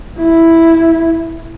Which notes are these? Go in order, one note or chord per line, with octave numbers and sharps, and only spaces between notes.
E4